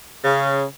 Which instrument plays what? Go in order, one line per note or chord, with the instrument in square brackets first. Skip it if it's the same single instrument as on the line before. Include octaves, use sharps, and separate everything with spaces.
[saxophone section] C#3